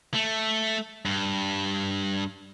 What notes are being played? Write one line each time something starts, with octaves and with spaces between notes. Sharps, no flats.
A3
G2